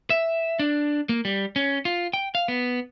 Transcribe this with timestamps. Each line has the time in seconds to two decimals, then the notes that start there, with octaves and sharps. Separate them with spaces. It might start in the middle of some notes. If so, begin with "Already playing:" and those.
0.10 E5
0.59 D4
1.09 A#3
1.25 G3
1.56 C#4
1.85 F4
2.13 G5
2.35 F5
2.48 B3